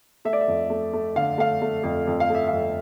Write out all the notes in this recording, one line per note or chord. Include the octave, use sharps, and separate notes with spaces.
A3 E5
D5
E5
F2
A3
A3
D3 F5
A3 F5
A3
F2
F2
F5
A3
E5
F2 F5